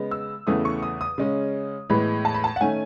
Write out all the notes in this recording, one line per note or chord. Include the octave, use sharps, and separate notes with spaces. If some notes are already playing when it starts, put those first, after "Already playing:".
Already playing: C#3 G#3 B3
E6
E2 C#3 E3 A3 D#6
C#6
D#6
D#6
C#3 G#3 C#4
A2 E3 G#3 B3 B5
A5
B5
A5
F#5
D#3 A3 C#4 G#5